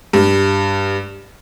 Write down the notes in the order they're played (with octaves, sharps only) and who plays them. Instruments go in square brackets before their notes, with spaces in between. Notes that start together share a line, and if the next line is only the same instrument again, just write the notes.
[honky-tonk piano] G2